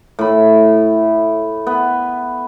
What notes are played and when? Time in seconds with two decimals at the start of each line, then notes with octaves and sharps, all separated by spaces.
0.19 A2 B5
1.67 B3